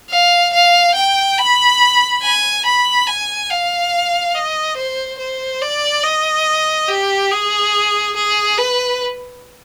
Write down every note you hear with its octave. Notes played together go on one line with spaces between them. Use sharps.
F5
F5
G5
B5
G#5
B5
G#5
F5
D#5
C5
C5
D5
D#5
G4
G#4
G#4
B4